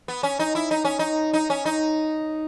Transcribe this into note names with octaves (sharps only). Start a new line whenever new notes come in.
B3
C#4
D#4
E4
D#4
C#4
D#4
D#4
C#4
D#4